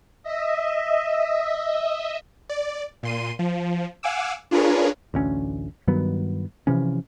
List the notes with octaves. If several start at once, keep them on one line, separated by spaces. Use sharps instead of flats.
D#5 E5
D5
A#2 C6 D#7
F3
F5 F#5 G#5 D6 E6
D4 F4 G#4 A#4 B4 C#5
A1 D2 C#4
G2 D#3 F#3 B3
C3 E3 F3 C#4